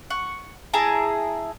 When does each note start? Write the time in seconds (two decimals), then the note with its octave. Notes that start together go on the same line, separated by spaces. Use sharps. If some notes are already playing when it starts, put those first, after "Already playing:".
0.10 F#5 C#6
0.73 E4 G#4 A5 A#5